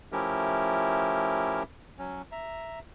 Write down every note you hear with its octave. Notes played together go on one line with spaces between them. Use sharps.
F3 A3 C#4 E4 G4 A#4
F#3 C#4
E5 A#5